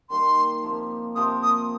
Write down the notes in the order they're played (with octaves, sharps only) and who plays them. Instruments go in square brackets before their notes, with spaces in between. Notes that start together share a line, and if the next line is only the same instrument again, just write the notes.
[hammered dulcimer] D#3 G3 A#3 D#4 [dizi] C6
[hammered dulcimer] C3 F3 A#3
[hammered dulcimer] C3 F3 A#3 [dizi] D#6
[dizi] D#6